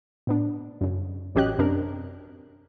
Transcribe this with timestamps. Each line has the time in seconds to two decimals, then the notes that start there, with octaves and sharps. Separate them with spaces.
0.27 A2 B3 D4
0.81 F#2 C#3
1.35 A1 F#3 C#4 G4 D#5 F#6
1.58 F#2 C3 D4 A#4